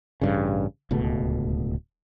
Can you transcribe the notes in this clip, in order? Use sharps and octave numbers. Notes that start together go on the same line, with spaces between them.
A1 G2 C#3
D1 C#2 B2 A3